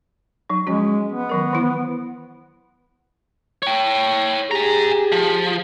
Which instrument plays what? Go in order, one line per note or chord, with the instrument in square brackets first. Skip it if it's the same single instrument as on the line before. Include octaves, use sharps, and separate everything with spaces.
[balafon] F#3 D#4
[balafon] F3 C#4 F#4 [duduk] G#3
[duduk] B3
[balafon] D#3 F#3 A#4
E3 E4
[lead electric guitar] C#5 G5
[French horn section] G4 G#4 [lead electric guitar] G#5 A#5
[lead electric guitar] F3